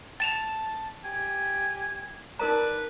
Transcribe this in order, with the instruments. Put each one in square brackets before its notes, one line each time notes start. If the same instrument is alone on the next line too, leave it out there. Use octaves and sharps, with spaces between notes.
[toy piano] G5 [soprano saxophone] A5 [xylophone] A6 E7 F7
[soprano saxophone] G4 [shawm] G#5
[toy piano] D#4 A#4 A#5 [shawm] B4 [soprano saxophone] D5